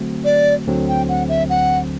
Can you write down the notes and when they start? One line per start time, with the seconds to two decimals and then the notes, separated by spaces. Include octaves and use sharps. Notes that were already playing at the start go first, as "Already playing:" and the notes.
Already playing: D3 F#3 A3 C4 F#4
0.25 D5
0.67 D2 D3 F#3 C4
0.88 G5
1.09 F#5
1.29 E5
1.50 F#5